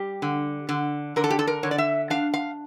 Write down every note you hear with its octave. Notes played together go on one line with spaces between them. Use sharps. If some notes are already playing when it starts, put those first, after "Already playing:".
Already playing: G3 G4
D3
D3
D3 A#4
A4
G4
A4
A#4
D3 C#5
D5
E5
D4 F5
F5